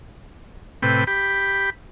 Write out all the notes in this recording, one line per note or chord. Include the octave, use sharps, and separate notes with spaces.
A2 C3 B4 G5
G4 B5